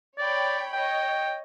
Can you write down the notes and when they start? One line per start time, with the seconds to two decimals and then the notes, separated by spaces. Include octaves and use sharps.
0.18 C#5 D5 G5 B5
0.73 C#5 D#5 G5